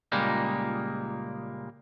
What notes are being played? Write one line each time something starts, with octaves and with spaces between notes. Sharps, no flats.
C#2 A#2 G3 G#3 A#3 D#4